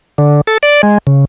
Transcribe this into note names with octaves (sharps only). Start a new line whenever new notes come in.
D3
A4
D5
G#3
C#3